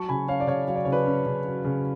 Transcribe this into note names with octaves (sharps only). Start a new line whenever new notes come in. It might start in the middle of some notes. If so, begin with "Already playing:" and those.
Already playing: F#3 A5 C#6
C#3 G#5 B5
C#4 C#5 F5
D5
C#3 C#5 F5
F#3 F5
D5
C#3 C#5
B4 D5
C#4
C#3
F#3
C#3